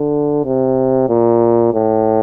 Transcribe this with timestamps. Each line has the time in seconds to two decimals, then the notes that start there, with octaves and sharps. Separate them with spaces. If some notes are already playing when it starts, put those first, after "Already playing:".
Already playing: D3
0.45 C3
1.09 A#2
1.74 A2